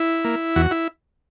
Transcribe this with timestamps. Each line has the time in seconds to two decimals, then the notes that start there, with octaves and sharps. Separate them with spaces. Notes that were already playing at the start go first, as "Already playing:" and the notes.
Already playing: E4
0.25 A#3
0.56 E2 F#4
0.71 E4